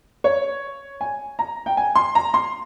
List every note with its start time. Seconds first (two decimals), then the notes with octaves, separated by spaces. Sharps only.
0.24 C#5
1.01 G#5
1.39 A#5
1.66 G5
1.77 G#5
1.95 C6
2.15 A#5
2.34 C6